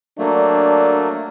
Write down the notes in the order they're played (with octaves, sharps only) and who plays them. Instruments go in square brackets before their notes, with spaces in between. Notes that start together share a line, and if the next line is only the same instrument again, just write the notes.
[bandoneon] F#3 A3 A#3 [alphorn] D4